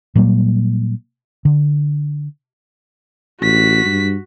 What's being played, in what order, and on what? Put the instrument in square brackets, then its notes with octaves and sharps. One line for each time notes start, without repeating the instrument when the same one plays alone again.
[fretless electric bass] A#2 F#3 G3 A#3
D3
[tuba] A1 [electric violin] F#4 B6
[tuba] G2